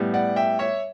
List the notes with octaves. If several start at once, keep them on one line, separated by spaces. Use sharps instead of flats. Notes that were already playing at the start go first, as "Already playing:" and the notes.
Already playing: A2 G3 B3
D5 F#5
E5 G5
C#5 E5